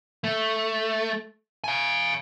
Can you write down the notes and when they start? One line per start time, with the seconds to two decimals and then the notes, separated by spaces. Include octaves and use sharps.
0.24 A3
1.64 F5 G#5